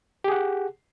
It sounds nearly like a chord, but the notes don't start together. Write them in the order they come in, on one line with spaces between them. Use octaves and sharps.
G4 G#4 F#5